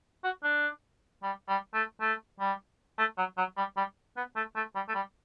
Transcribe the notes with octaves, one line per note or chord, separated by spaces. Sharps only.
F#4
D4
G3
G3
A3
A3
G3
A3
F#3
F#3
G3
G3
B3
A3
A3
G3
A3
G3